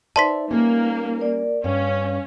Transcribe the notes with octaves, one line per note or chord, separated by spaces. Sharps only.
D#4 B4 C5 D5 E5 A5 C6 B6
G3 A#3 C#4
A#4 D5
G2 C#4 C#5 F5